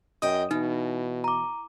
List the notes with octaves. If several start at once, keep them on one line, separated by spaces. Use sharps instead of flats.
F#2 D#5 G5 D#6
B2 E3 D#4
A#5 D6